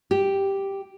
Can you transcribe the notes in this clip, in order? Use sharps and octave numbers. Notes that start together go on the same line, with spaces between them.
G4